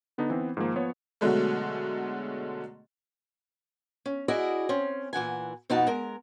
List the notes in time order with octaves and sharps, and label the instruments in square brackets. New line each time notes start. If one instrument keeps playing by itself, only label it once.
[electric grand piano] D3 B3 D4 D#4
E3 B3 C4
G#2 D#3 F3 A#3
F3 B3 C#5
[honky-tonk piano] B2 D3 F#3 G#3 A3
[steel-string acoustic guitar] C#4
E4 F#4 G#4 D5 D#5
C4 C#4
A#2 E3 F#5 G#5
F2 B2 D#4 F#4 F#5 A5
G#3 A#4